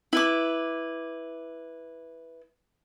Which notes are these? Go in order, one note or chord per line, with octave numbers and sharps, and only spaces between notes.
E4 B4 D6